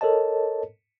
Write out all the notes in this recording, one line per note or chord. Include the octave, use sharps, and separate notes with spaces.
A4 A#4 C#5 D#5 A5